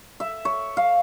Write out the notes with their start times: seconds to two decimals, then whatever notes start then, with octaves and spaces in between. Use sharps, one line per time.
0.20 E5
0.45 C#5
0.77 F5